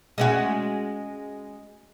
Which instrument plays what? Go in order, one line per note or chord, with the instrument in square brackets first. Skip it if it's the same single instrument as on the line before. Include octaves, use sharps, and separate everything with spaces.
[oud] G#3 C#4 F#4